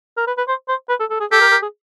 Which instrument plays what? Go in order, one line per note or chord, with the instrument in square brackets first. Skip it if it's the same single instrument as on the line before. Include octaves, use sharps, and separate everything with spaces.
[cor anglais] A#4
B4
B4
C5
C5
B4
A4
A4
G#4
[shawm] G4 [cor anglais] A4
[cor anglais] A#4
A#4
G#4